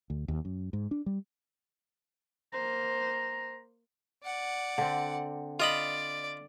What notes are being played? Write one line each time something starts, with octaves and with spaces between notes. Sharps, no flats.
D2
D#2
F#2
G#2
D4
G3
A#3 C5 A#5
D5 F#5
D3 C4
F4 D5 D#5 B5